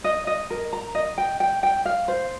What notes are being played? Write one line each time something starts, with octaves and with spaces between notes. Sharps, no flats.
D#5
D#5
A#4
A#5
D#5
G5
G5
G5
F5
C5